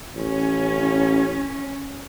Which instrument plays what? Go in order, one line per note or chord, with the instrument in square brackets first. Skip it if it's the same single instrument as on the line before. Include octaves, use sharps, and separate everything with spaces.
[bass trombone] A1 [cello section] C#4